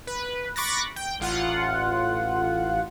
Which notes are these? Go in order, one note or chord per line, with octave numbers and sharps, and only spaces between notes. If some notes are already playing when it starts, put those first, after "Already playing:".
B4
B5 C#6 D6 F#6 A6 A#6
G5
A1 F4 F#5